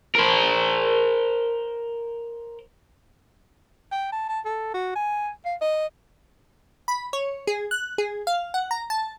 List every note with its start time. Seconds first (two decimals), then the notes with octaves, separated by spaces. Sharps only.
0.15 A#4 C5
3.92 G5
4.12 A5
4.29 A5
4.45 A4
4.74 F#4
4.96 G#5
5.45 F5
5.61 D#5
6.88 B5
7.13 C#5
7.47 G#4
7.71 F#6
7.98 G#4
8.27 F5
8.54 F#5
8.71 A#5
8.90 A5